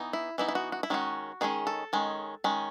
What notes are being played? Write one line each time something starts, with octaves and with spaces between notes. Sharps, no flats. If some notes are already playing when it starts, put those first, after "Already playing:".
Already playing: E3 B3 D#4
E4
E3 B3 D#4 E4
E4
F#4
F#4
E4
D#3 G#3 C#4 F#4
D#3 G#3 C#4 G#4
A4
D#3 G#3 C#4
D#3 G#3 C#4